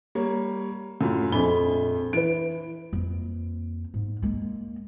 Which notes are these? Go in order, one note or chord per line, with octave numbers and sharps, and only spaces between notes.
G3 A#3 C#5
F#2 A2 F4
A#1 F2 G#5 B5 G7
E3 B4 D7
F2 A#3
G#2
G#3 A#3